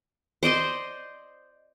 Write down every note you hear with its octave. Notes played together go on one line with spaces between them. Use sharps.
C5 D5 D#5 C6